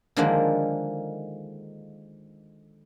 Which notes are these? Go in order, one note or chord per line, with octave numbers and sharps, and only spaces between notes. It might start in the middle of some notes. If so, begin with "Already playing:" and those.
D3 D#3 F3 G#3 A#3 D4